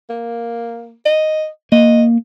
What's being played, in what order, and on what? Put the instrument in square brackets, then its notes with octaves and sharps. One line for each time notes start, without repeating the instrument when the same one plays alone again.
[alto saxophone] A#3
D#5
[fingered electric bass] A#3 [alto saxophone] D#5